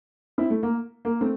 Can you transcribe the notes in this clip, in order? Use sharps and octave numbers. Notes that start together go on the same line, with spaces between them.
C4 E4
A3
A#3
A#3
A3 C4